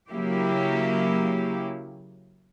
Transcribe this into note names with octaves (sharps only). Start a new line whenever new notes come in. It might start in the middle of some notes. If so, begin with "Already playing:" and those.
C#3 F#3 A#3 E4 G4